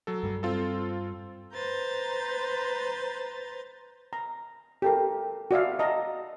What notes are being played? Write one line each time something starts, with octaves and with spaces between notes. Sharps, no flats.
F#3 A4
G2 G3
C4 F4 A4
B4 C5 A#5 G6 A6
A#5
G4 A4 A#4
F#4 D5 E5 F5
D#5 A5 A#5